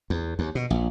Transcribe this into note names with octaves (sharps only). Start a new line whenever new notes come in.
E2
D#2
B2
A#1